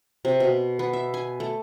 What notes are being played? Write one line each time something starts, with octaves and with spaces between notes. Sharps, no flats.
C3
B2
B3
E5
G#5
A3